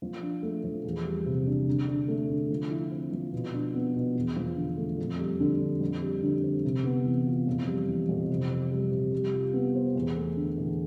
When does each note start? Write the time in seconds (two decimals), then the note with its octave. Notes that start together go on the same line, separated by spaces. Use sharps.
0.02 F3
0.22 D4
0.43 A3
0.64 F3
0.84 E2
1.05 G3
1.26 C3
1.47 D4
1.67 D3
1.87 D4
2.08 A3
2.29 D3
2.51 F3
2.71 E4
2.92 C4
3.12 F3
3.33 B2
3.54 D4
3.74 B3
3.95 B2
4.16 E2
4.36 F3
4.56 D3
4.77 A3
4.98 F2
5.19 G3
5.40 D3
5.60 D4
5.81 F2
6.02 G3
6.23 D3
6.43 C4
6.64 C3
6.84 B3
7.05 E3
7.27 F4
7.47 F2
7.67 G3
7.88 E3
8.09 F2
8.30 C3
8.50 C4
8.71 G3
8.92 C3
9.12 G3
9.33 F4
9.54 B3
9.75 C5
9.96 E2
10.16 A3
10.37 D3
10.58 E2